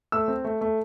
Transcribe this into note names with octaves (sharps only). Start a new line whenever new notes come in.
A3 E6
C4
A3
A3